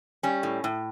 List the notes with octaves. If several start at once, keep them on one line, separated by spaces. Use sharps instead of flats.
G3 C#4
A2
A2